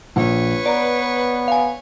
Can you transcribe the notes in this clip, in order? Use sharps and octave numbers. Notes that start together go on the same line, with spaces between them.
A#1 B4 C#5
B3 D5 A#5
F5 G#5